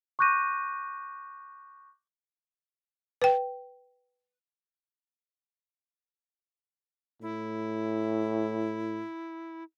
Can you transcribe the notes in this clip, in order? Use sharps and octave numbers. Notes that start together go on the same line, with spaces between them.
C#6 D6 F#6 G6 A#6 D#7
B4 G5
A2 E4